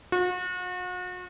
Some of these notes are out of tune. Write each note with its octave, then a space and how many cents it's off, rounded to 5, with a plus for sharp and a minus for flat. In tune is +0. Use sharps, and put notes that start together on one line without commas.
F#4 -40